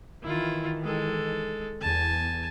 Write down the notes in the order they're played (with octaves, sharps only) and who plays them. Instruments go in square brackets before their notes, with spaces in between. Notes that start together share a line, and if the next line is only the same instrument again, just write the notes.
[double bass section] D#3 E3 [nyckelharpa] E4 F4
[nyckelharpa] G#3 A4
[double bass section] E2 [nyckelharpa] G#5 A5